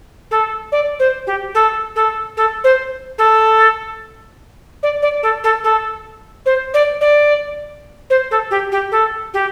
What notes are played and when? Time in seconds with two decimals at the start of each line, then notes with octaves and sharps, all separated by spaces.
0.31 A4
0.72 D5
0.99 C5
1.27 G4
1.55 A4
1.96 A4
2.37 A4
2.64 C5
3.18 A4
4.83 D5
5.02 D5
5.23 A4
5.44 A4
5.64 A4
6.46 C5
6.74 D5
7.01 D5
8.10 C5
8.31 A4
8.51 G4
8.72 G4
8.92 A4
9.34 G4